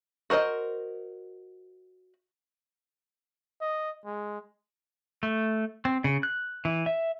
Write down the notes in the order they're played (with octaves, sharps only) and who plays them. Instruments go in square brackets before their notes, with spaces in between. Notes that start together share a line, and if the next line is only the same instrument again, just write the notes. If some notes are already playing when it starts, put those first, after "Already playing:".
[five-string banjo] F#4 A#4 C5 D#5
[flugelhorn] D#5
G#3
[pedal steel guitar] A3
C4
C#3
F#6
E3
E5